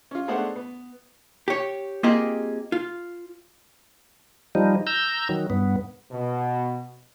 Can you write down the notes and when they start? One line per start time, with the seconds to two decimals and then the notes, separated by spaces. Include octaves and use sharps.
0.11 C#4 F4
0.28 G#3 A3 B3 D4 C5 F#5
0.56 B3
1.48 G4 C#5
2.03 A#3 C4 F4 G4 G#4 D#5
2.72 F4
4.55 F3 G3 D#4
4.87 A#5 E6 G6
5.29 D#3 F#3
5.50 G2 B3
6.11 B2